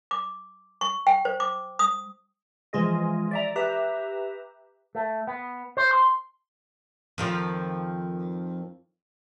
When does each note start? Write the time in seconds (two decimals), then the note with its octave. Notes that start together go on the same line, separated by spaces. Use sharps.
0.11 D6
0.81 C#6
1.07 G5
1.25 C5
1.40 D6
1.79 D#6
2.73 E3 F3 G#3 F4 G#4 D#5
3.31 D5 E5 A#5
3.56 G4 B4 E5 A#5
4.95 A3
5.27 B3
5.77 C5
5.91 C6
7.18 F2 D#3 F3